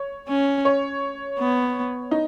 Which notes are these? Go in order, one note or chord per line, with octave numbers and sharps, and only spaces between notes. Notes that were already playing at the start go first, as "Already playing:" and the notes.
Already playing: C#5
C#4
C#5
B3
D#4